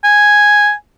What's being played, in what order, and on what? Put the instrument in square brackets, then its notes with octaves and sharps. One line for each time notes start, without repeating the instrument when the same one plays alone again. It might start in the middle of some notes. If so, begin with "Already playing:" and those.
[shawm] G#5